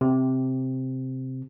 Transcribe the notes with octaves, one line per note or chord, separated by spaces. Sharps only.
C3